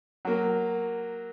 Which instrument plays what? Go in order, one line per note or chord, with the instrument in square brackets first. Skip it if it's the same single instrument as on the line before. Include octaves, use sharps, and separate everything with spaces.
[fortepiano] F#3 A#3